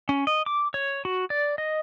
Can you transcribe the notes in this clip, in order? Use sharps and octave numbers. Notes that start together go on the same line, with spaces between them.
C#4
D#5
D6
C#5
F#4
D5
D#5